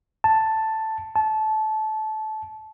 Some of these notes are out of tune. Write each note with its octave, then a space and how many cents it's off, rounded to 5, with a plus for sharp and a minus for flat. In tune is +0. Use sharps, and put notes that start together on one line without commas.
A5 +5
A5 -20